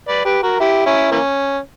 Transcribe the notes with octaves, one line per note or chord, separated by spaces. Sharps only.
B4 D5
G4 B4
F#4 A#4
E4 G4
C#4 E4
E3 A#3 C#4